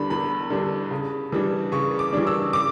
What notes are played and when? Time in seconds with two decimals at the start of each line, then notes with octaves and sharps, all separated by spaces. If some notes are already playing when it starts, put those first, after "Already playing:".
Already playing: E2 D3 G3 D4 B5
0.10 E2 B5
0.50 D3 G3 D4
0.91 C#3
1.32 E3 G3 D4
1.72 C#3 C#6
1.99 D6
2.13 E3 G3 D4
2.27 E6
2.53 C#3 D6